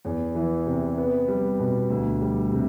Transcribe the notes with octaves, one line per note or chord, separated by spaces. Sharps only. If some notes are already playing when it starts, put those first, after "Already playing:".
E2
E3
C3
B3
G3
B2
D2
G3
C3